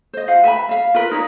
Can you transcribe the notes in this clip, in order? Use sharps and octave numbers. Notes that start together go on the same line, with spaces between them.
C5 D#5
F4 F5 F#5
B4 E5 G#5 B5
E5 F5
F4 A#4 B4
D#4 C#5 D5